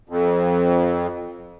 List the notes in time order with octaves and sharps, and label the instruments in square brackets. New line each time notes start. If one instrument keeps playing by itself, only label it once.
[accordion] F2